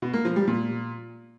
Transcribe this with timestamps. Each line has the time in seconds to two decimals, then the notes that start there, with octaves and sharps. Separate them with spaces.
0.02 B2
0.13 A#3
0.25 F3
0.36 G3
0.47 A#2